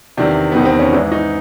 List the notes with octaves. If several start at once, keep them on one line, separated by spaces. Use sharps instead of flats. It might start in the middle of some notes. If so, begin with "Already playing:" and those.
E2 C3 D#3 D4
E2 C3 D#3 B3
C4
C#4
G#2 E3 D4
D#4